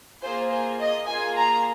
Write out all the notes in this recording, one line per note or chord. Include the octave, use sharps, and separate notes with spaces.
A#3 F4 G#4 C5
C5
D#5
A#3 F4 G#4 G#5
A#5